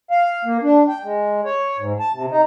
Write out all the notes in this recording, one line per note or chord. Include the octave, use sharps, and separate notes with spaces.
F5
A#3
D4
G5
G#3
C#5
G#2
A5
C3
D#4